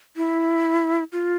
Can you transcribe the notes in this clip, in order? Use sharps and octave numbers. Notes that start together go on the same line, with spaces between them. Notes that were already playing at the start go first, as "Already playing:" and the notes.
E4
F4